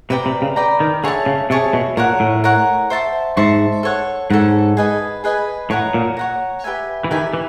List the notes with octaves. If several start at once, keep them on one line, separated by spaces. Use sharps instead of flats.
C3 B4 D5 G5 A#5
C3
C#3
B4 D5 G5 A#5
D#3
D3 G#4 C#5 E5 A5
C#3
C3 G#4 C#5 E5 A5
B2
A#2 A#4 C#5 F#5
A2
A#4 C#5 F#5
C5 E5 A5 C#6
G#2 C5 E5 A5 C#6
A4 C#5 F#5
G#2 A4 C#5 F#5
G#4 B4 D#5 G#5
G#4 B4 D#5 G#5
A2 C#5 F#5 A#5
A#2
C#5 F#5 A#5
G4 B4 E5 G#5
E3
D#3 G4 B4 E5 G#5
E3